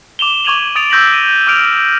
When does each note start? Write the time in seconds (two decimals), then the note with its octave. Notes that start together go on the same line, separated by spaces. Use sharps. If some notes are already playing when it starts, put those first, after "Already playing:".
0.19 D6 E7 F7 G7
0.45 C#6 D6 G#6 D#7 F7 F#7
0.76 D#6 A6 D7 F7
0.90 C#6 E6 G6 A#6 B6 F#7
1.14 D#7
1.47 D6 F6 D7 F7